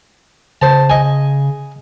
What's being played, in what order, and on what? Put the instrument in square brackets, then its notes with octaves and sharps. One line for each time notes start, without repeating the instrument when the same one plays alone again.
[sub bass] C#3 [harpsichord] C5 A5
[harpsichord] D#5 G#5